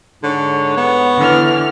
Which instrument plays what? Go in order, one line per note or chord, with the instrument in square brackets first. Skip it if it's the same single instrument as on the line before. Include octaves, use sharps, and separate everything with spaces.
[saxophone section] G#2 C#5 [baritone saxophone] D3
[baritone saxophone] B3
[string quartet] D3 E3 F6